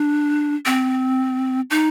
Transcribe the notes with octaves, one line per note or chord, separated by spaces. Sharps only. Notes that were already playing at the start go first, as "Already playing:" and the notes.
Already playing: D4
C4
D#4